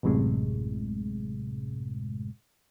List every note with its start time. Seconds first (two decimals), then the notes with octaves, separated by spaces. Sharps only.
0.03 A1 F#2 A2 C3 G#3